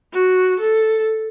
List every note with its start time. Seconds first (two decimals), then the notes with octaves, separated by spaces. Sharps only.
0.13 F#4
0.60 A4